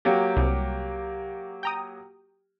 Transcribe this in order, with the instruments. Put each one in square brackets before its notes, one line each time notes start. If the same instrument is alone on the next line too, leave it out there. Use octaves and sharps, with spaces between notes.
[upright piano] F#3 A#3 G4
[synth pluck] C2
G5 A#5 D#6